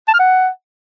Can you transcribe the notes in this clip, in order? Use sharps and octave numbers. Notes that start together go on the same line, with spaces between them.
A5
F6
F#5